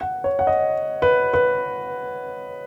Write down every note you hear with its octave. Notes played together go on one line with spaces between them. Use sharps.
F#5
C#5
F#5
D#5
B4
B4